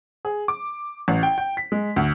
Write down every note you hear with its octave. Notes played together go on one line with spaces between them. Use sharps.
G#4
D6
A1
G5
G5
B6
G#3
D2